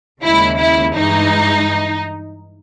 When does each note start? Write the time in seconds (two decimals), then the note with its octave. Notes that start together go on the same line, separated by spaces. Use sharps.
0.23 D#2 C#3 G#3 E4
0.59 E4
0.96 G2 E3 G#3 D#4